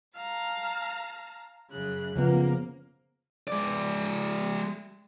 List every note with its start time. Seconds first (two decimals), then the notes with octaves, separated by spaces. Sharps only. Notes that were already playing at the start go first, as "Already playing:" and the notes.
0.16 F5 A5 A#5
1.71 F#2 C#3 F#6
2.15 C#3 F3 A#3 B3
3.48 G#3 D5